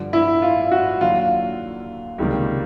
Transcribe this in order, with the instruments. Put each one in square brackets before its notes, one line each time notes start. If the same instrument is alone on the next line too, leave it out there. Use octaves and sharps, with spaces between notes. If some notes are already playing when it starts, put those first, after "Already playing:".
Already playing: [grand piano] G2 D3 F3
[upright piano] E4
F4
F#4
[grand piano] D#2 D3 F#3 [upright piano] F4
[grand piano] C#2 C3 D#3 G3 A#3